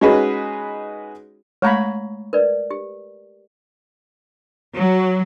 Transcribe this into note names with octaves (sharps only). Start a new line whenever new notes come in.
G#3 C#4 D#4 F#4 G#4 B4
G#3 A3 C#5 F5 A#5 B5
A#4 B4 D5
G4
F#3